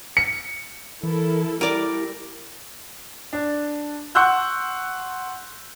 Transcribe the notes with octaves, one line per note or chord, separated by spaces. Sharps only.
C#7
E3 E4 A4 A#4
G3 E4 A4 A#4 D5 D6
D4
F#5 C6 C#6 E6 F#6 G6